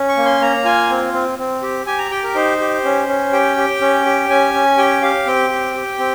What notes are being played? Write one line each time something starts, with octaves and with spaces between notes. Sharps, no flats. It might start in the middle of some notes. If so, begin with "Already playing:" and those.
Already playing: C#4
C#6
A#3
C6
A#3 A#5
F4 G#5
C4
C4
C4
G4
G4 G#5
A#5
G4 G5
A#4
D#4 C5
G4
C#4
C#4
G4 G5
G4
C#4
G4
C#4 G#5
C#4
G4 G5
G4 F5
C4 G5
G4
G4
C4